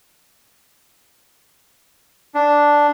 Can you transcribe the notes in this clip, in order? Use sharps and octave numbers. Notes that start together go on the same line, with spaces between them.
D4